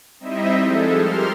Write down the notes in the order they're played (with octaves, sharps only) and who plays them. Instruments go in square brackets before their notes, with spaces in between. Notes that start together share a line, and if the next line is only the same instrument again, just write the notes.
[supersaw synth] G3 C4 D#4 E4 D#5 E5
F3 G#3 A4
G4 A#4 C6 F6